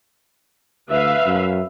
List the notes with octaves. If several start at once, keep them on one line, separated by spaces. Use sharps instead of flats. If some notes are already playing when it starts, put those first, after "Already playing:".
D2 B4 E5 F5
F#2